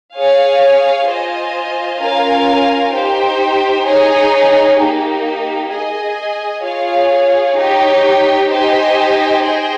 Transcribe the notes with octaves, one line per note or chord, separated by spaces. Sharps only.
G#4 C#5 F5 G#5
F4 C5 D#5 G#5
C#4 F4 A#4 F5 G#5
D#4 G4 C5 G5
D#4 G#4 C#5 G#5
A#3 D#4 G4
G#4 D#5 G#5
F4 G#4 C#5 F5
D#4 G4 C#5
D#4 G4 C5 D#5 G#5
G#4 C5 D#5 G5